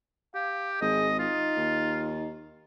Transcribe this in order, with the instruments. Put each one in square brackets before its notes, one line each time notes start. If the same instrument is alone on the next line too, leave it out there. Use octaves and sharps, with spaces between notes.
[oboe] G4 [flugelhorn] F5
[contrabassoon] G#1 [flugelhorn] G#4 [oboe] D#5
[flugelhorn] D#4 [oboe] F4
[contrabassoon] D#2